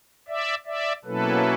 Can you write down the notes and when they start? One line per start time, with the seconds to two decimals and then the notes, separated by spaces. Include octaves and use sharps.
0.28 D5 E5
0.66 D5 E5
1.05 B2 F#3 A#3 C#4 E4 A4 B4